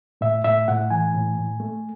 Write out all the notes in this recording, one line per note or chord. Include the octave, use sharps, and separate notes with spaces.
A2 E5
A2 E5
A2 F#5
E3 G#5
A2
A2
A3